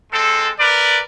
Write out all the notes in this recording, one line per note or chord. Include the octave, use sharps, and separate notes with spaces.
G#3 C4 A4
A#4 B4 D5